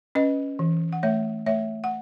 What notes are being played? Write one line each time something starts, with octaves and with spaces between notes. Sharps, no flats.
C#4 B4 D#5
E3
F#5
A3 C#5 E5
A3 C#5 E5
F#5